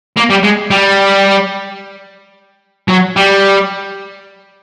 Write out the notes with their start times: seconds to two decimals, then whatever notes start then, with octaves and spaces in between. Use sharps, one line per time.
0.17 A#3
0.30 G3
0.44 G#3
0.71 G3
2.88 F#3
3.16 G3